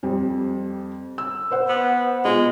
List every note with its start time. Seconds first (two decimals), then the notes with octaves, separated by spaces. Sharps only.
0.03 F2 G3
1.18 E6
1.51 B4 C5 F#5
1.69 B3
2.25 B2 G#3 F4